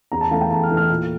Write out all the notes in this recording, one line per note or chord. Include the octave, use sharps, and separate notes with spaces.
E2 A#5
A5
E3 A3 F5
G5
E2 A5
F6
E3 A3
F6
A#2